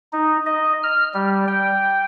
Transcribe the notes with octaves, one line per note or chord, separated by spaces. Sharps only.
D#4
D#5
F6
G3
G5